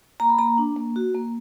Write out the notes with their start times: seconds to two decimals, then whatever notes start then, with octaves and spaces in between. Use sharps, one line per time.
0.20 A#3 A#5
0.29 B5
0.39 A#3 A#5
0.58 D4
0.76 A#3
0.96 F#4
1.14 A#3